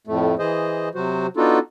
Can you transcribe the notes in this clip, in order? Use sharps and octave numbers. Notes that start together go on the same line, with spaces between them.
F2 A2 A3
E3 G#4 C5 D#5
C3 F#3 F#4 C5
B3 D4 D#4 F4 F#4 A4